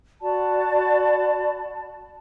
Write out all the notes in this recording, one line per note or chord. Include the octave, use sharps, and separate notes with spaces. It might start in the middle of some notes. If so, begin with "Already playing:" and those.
F#4 D5 A5 B5